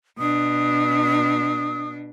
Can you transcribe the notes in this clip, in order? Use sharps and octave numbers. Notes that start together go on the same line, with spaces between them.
B2 D4 D#6